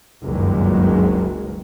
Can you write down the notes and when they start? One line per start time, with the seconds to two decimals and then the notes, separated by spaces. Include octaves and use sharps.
0.24 F#1 C#2 G2 D#3 F#3 G#3